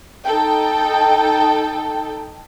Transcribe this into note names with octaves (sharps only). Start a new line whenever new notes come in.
D#4 A4 G5